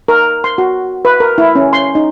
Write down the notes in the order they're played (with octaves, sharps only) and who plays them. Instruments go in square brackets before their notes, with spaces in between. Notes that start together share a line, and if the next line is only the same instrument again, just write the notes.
[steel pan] A#4
C6
F#4
B4
A#4
E4
C#4
C6
D#4